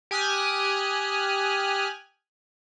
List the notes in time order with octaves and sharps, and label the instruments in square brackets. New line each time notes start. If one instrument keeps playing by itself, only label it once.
[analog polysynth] G4 G#5 D#6 F6 F#6